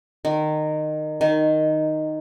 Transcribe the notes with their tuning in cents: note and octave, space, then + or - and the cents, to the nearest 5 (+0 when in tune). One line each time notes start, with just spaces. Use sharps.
D#3 -20
D#3 -5